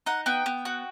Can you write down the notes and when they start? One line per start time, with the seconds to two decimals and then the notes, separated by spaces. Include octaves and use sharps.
0.06 D#4 F#5
0.26 B3 G5
0.46 B3
0.65 F#4